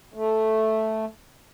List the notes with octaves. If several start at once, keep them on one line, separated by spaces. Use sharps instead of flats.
A3